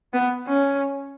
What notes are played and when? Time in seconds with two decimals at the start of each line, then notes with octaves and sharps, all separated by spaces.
0.13 B3
0.47 C#4